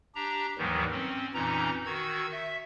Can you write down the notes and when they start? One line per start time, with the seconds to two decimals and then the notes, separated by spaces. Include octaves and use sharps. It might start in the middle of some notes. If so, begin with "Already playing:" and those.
0.15 D4 G4 A#5
0.58 D#2 G#2 D#3 E3 F#3 G3
0.91 C4 C#4
1.34 F2 A#2 E3 C#4 D#4 A#5
1.86 D#3 F#4 E6 G#6
2.32 E5